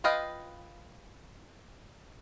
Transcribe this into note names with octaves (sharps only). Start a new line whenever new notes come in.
F4 B4 D#5 F5 G5